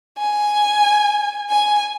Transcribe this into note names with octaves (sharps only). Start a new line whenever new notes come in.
G#5
G#5